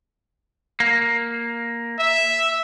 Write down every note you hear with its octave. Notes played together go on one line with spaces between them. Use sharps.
A#3
E5